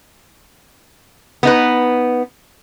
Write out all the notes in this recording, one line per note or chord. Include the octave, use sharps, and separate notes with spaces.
B3 D#4 B4